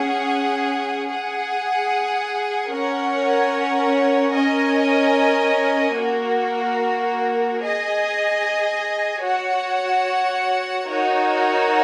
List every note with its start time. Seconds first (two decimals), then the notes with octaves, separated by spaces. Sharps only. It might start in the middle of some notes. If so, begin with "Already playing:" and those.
Already playing: C#4 G#4 F#5
1.08 G#4 F#5
2.71 C#4 A#4 C#5 F#5
4.34 C#4 A#4 D#5 G#5
5.97 A#3 F#4 A#4
7.61 G#4 D#5 G#5
9.24 F#4 C#5 F#5
10.87 D#4 F#4 A#4 C#5